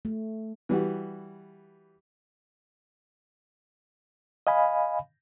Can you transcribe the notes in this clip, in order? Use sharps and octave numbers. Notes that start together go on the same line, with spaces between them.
A3
E3 G3 F#4
D#5 F5 G#5 B5